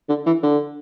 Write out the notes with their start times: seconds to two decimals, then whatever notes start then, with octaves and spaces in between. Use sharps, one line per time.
0.09 D3
0.26 E3
0.43 D3